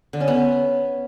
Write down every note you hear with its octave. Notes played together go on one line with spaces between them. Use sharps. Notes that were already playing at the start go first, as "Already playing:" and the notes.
D3
C#4
B3